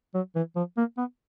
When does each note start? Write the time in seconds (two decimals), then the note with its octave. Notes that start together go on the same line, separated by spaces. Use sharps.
0.14 F#3
0.36 E3
0.56 F3
0.77 A#3
0.98 B3